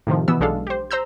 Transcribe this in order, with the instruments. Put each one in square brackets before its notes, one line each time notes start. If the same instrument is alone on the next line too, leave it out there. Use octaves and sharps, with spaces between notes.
[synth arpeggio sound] A2 C3 D#3 F3
B2 E3 B3 E6
B1 G#3 D4 A4 F5
G4 C5
C5 A#5 E6 G6